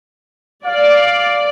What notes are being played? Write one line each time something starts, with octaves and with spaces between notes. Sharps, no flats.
D5 F5